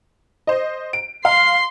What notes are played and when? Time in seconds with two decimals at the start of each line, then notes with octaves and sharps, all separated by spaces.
0.47 C5 D#5
0.93 D7
1.25 F5 C6